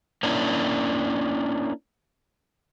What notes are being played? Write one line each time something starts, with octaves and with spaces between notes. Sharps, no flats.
A#3 C#4 D4 E4